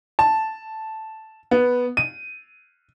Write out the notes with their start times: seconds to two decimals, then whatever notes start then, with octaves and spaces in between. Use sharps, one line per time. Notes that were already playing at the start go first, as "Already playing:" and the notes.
0.19 A5
1.51 B3
1.97 D#7